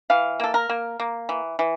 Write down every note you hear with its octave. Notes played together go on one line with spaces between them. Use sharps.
E3 F5
A#3 A4
A#4
A#3
A#3
E3
E3